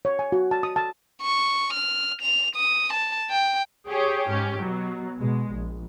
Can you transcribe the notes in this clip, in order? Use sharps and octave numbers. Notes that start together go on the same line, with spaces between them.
C#5
G#5
F#4
A5
D#6
A5
C#6
F6
F7
D#6
A5
G5
G4 G#4 C#5 G5
G#2 C#4 G4
B2 F#3
B2 G#3
A#1